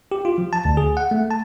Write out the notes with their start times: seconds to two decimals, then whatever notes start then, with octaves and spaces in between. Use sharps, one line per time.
0.12 G4
0.25 F4
0.38 F3
0.53 A5
0.65 D2
0.77 G#4
0.97 F#5
1.11 A3
1.31 A5